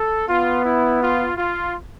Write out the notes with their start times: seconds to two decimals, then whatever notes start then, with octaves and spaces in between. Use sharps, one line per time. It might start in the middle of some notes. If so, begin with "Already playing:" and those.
Already playing: A4
0.28 B3 F4
0.64 E4
1.01 F4
1.37 F4